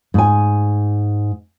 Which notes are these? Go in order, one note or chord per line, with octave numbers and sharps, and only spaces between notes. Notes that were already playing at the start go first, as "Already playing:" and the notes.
G#2 G#5